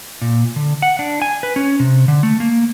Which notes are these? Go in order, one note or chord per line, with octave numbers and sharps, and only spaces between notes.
A#2
D3
F#5
D4
G#5
B4
C#4
C3
D3
A3
A#3